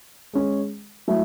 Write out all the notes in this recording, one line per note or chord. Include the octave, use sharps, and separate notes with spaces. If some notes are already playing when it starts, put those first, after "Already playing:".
G#3 C#4 G#4
F#3 A3 E4